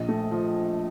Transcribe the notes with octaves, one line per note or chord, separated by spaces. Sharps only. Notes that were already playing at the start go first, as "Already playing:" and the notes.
Already playing: A#1 D#5
A3
F3